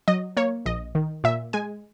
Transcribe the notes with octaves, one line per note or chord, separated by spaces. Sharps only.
F#3 D#5
A#3 C#5
A#1 D#5
D#3
A#2 E5
G#3 G#5